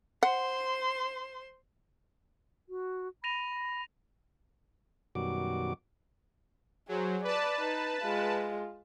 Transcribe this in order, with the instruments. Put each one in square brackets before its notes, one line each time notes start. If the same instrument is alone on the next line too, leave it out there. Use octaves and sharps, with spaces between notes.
[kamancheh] C5 C6 [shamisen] F#5
[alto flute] F#4
[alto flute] B5 [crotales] A#6 D#7 F7
[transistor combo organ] F#2 B2 D#3 G3 F#4 D6
[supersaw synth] F#3 [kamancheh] G#4 C5
[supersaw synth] B4 A5 [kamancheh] D5
[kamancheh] D#4
G#3 F4